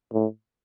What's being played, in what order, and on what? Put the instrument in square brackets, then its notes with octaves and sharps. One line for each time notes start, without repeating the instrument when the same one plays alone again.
[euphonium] A2